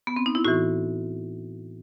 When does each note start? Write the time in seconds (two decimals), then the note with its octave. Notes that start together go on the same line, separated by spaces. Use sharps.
0.07 B3
0.16 C4
0.26 D#4
0.35 E4
0.45 A2 E3 F#4